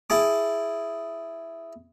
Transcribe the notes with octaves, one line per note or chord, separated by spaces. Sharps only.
E4 G#4 A5 D6